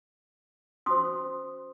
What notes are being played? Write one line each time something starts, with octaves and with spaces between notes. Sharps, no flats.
C#4 F#4 C5 C6 D#6